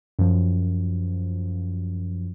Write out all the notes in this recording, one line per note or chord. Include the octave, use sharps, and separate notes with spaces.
F#2 F3